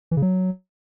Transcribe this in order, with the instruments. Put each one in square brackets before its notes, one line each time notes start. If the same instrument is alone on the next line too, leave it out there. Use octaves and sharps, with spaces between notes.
[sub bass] E3
C#3
F#3